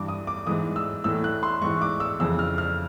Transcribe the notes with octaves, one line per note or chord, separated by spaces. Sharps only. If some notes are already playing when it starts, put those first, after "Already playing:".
Already playing: G2 E3 D6
D#6
D6
G#2 E3 D#6
E6
A2 E3 E6
F#6
C6
G#2 E3 C#6
D6
E6
F2 C#3 E3 E6
F6
F6